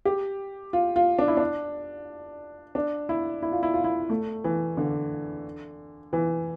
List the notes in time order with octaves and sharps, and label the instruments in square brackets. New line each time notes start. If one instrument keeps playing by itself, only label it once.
[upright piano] G4
F4
F4
D4
E4
D4
D4
E4
E4
F4
E4
F4
E4
A3
E3
D3
E3